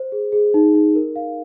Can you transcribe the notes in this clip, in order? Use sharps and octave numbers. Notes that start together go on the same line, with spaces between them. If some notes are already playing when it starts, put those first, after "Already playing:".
Already playing: C5
G#4
G#4
D#4
D#4
A#4
F5